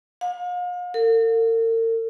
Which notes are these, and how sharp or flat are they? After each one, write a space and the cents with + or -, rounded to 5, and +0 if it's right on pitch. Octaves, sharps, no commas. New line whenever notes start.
F5 +40
A#4 -45